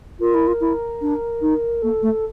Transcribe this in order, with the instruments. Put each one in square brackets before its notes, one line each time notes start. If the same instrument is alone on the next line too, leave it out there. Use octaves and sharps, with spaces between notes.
[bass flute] F4 [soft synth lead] A#4
[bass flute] E4
F4
E4
D4
D#4
[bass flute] A#3 [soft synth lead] A4
[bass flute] A3